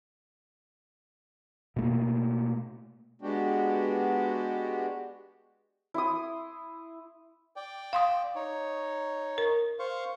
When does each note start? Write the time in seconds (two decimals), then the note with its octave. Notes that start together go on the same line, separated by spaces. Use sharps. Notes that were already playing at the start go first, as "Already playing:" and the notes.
1.76 B2 A3 A#3
3.22 G#3 B3 D4 F#4 G4
5.94 E4 C6 D#6
7.56 D5 G5
7.93 F5 C6 D#6
8.35 D#4 C#5
9.38 A#4
9.79 C5 F5 C#6